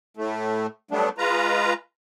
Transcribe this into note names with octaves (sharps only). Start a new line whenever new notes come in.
A2 A3
F#3 G3 A3 B3 D4
G#3 F4 B4 A#5